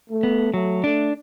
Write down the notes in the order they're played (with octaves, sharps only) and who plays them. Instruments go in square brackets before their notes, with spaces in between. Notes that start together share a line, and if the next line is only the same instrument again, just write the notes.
[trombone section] A3
[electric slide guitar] B3
[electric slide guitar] F#3 [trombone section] A3
[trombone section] A3 [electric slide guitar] D4